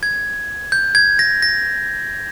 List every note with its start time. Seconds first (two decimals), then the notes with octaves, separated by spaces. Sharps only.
0.03 G#6
0.72 G6
0.95 G#6
1.19 A#6
1.42 A#6